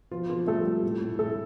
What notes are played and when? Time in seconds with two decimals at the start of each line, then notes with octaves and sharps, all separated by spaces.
0.11 B2 F3 F4
0.30 B2 F3 F4
0.47 G3 A3 A4
0.65 G3
0.83 A2
1.01 A2
1.19 A2 A3 A4